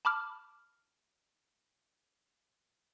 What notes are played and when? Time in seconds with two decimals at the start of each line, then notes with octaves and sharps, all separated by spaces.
0.05 A5 B5 D6 F6